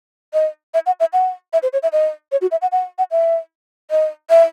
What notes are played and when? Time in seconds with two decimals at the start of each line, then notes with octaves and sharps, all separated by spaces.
0.33 D#5
0.74 E5
0.86 F#5
1.00 E5
1.13 F#5
1.53 E5
1.63 C5
1.73 C#5
1.83 E5
1.92 D#5
2.32 C#5
2.41 F#4
2.51 E5
2.62 F#5
2.72 F#5
2.98 F#5
3.11 E5
3.91 D#5
4.30 E5